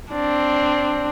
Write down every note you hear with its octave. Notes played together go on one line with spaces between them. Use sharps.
C4 D4